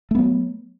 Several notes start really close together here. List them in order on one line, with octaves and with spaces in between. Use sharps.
A3 B3 F#3